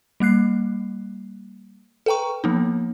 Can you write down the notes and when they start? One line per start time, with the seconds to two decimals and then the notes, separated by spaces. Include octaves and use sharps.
0.20 G3 A#3 F#6 C7
2.06 A4 B4 G5 A#5 C#6
2.44 F3 A#3 B3 D#4